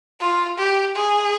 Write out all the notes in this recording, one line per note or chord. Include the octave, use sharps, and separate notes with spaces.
F4
G4
G#4